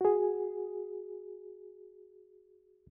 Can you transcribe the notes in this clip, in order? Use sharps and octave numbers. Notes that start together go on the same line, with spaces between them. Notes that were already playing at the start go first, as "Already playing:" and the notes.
F#4 G#4